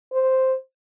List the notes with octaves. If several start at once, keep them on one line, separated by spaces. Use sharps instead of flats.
C5